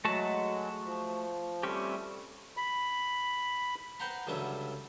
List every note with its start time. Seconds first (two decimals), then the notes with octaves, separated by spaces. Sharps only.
0.05 F#3 G#3 A3 F#4 A5
0.84 F3
1.63 G3 A3 C4 C#4 G4
2.57 B5
4.00 B4 C5 F#5 G5 A#5 C6
4.27 C#2 D3 F#3 G3 E5